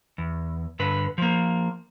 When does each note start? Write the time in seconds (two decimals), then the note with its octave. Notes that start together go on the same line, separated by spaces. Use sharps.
0.18 E2
0.79 G2 D3 B4
1.18 F3 A#3